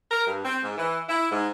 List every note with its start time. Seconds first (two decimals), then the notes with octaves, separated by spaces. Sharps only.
0.11 A#4
0.27 G2
0.45 C4
0.63 G#2
0.78 E3
1.09 E4
1.32 G#2